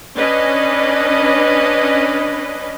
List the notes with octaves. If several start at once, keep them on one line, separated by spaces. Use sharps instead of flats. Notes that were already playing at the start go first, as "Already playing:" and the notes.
C#4 D4 B4 D#5